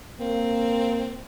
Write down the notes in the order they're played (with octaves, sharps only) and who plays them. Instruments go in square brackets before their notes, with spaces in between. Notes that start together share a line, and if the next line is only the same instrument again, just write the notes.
[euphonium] A#3 [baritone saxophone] C4